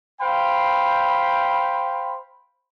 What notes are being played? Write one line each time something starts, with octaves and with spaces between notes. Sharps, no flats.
C5 F5 G5 B5